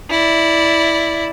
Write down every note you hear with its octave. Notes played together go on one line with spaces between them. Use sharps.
E4 D5